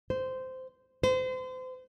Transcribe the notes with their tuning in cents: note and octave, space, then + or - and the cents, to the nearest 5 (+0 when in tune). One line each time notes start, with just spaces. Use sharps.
C5 -15
C5 -35